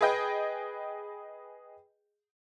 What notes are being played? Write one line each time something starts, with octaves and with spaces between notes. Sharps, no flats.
G#4 B4 D#5 G5